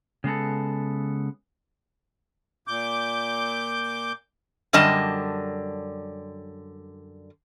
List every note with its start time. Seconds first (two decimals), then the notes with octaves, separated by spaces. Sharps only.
0.24 C#3 G#3 B3 A4
2.67 A#2 D6 G6
4.73 F#2 D3 G3 D#5 A5